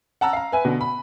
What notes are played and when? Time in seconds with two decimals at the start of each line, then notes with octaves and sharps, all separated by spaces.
0.21 F#5 A5 A#5 E6
0.33 F5 A#5
0.52 B4 E5 G#5
0.65 B2 D3
0.81 B5